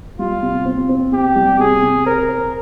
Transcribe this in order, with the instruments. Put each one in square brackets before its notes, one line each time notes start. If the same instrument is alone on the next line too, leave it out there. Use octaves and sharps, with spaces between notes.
[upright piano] G3 [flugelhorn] F4
[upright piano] C3
C4
C4
[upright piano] C3 [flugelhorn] G4
[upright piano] G3
[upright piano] C3 [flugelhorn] G#4
[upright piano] C3
[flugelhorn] A#4 [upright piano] C5
[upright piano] C5